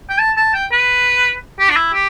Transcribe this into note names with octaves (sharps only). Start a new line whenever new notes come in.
G5
A5
A5
G5
B4
G4
D4
E4
G4